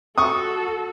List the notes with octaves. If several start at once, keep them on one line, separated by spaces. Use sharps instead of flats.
F#4 A4 C#6 D#6